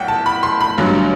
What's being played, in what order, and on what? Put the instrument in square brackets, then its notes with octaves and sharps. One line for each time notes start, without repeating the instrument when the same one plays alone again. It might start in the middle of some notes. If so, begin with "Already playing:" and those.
Already playing: [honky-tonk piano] B1 A2 F#5 G5
A5
B5
C6
B5
A1 G2 D3 F#3